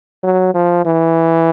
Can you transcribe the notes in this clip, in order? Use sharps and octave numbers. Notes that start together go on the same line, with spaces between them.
F#3
F3
E3